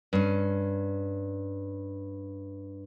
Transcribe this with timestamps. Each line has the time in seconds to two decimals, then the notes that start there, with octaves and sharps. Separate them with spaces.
0.13 G2 C#4